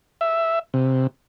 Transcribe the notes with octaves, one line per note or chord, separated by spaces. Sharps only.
E5
C3